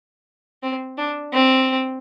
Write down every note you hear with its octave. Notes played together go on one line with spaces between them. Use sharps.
C4
D4
C4